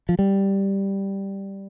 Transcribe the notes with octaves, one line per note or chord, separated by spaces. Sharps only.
F3
G3